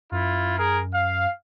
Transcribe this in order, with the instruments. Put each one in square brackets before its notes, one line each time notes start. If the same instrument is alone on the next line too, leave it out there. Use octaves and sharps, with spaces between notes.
[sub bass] F#2 [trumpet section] E4 F4
[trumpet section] G#4 A#4
F5